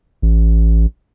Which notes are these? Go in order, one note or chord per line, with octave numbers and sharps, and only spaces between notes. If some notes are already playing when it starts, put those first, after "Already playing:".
A1